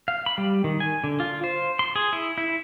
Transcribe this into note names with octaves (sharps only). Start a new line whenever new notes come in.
F5
B5
G3
D#3
G#5
D3
F4
C5
C6
G#4
E4
E4